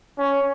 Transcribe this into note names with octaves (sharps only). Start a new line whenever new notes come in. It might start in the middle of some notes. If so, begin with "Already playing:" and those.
C#4